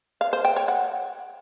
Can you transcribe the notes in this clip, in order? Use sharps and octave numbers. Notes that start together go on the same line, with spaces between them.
F5
C5
G5
C#5
F#5